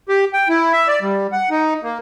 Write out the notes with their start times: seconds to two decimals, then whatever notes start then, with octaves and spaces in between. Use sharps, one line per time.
0.09 G4
0.34 G5
0.49 E4
0.73 E5
0.88 D5
1.01 G3
1.32 F#5
1.50 D#4
1.83 A#3